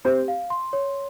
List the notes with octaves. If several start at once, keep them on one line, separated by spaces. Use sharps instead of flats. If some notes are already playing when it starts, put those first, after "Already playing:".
C4 G4 C5
F5
C6
C#5